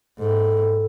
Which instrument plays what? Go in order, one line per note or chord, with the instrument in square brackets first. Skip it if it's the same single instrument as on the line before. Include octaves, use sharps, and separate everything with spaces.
[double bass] G#2 [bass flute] A4